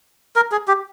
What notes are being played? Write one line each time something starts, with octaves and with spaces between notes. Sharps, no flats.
A#4
G#4
G4